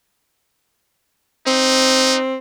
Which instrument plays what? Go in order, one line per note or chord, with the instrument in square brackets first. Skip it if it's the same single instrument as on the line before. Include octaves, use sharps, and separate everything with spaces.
[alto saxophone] C4 [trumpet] D#4